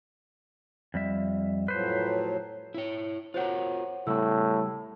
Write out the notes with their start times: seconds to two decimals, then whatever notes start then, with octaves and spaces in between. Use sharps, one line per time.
0.94 F2 G3 E5
1.68 A2 F3 F#3 B4 C5
2.74 E4 C#5
3.34 F4 F#4 A#4 C5 C#5 F#5
4.07 A2 C#3 G3 E6